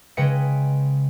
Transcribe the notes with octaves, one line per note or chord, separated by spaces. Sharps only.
C#3 G#3 B4 D#5 G5 C#7